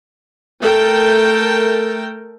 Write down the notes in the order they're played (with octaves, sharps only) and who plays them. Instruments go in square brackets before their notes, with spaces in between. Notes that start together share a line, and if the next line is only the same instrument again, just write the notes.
[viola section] A3 A4 A#4 G5